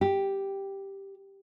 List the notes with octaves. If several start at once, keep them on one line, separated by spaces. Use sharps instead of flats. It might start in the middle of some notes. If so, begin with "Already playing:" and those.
G4